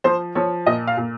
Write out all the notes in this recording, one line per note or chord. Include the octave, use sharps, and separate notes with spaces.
F3 C5
F3 C#5
A#2 D#5
F5
A#2